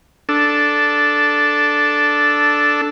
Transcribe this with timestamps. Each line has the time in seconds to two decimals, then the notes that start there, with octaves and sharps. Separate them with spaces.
0.29 D4 A4